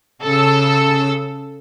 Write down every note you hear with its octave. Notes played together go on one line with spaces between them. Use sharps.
C#3 A4 E6